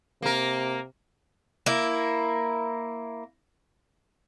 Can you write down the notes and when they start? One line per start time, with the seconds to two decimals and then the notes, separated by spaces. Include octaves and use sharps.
0.22 C3 A#3 A#4
1.66 A#3 E4